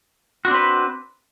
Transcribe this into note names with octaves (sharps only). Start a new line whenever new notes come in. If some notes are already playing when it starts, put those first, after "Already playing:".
C4 D4 F#4 B4